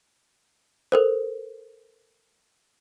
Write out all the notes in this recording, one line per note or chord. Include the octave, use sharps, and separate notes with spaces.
A4 A#4 C5